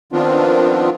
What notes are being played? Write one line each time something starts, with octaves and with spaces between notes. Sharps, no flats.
D#3 F3 B3 C4 D4 F4